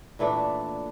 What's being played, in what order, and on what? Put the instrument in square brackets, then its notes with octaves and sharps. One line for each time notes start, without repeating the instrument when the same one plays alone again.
[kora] A#2 E3 A3 D4